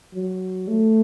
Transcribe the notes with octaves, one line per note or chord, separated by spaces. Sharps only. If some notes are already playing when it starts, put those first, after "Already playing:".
F#3
A3